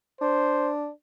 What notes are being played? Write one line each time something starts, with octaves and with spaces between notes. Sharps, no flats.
D4 C5